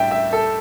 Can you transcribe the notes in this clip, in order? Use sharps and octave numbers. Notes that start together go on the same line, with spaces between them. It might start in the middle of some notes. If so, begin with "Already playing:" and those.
Already playing: A2 G3 D4 E5 G5
E5
A4